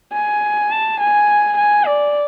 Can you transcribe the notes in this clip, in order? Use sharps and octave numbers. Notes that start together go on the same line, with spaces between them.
G#5
A5
G#5
G#5
D5